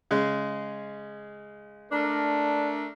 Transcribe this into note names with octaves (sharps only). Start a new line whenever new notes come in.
C#3 G#3
A3 D4 A#4